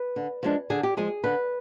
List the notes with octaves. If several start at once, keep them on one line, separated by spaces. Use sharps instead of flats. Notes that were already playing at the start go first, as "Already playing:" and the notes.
Already playing: B4
D3
F3 G#3 D4
D3 G#4
G4
F3 G#3 G#4
D3 B4